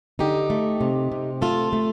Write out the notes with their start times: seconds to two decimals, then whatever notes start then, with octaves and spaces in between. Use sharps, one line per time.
0.19 D3 D#4 G4
0.50 A3
0.81 C3
1.12 C3
1.41 A3 F4 A4
1.73 A3